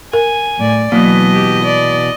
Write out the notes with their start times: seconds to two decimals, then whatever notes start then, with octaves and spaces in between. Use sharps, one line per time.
0.13 A#4 G#5
0.59 A2 D5
0.92 B2 E3 F#3 A#3 B3 D#5
1.33 G4
1.64 D5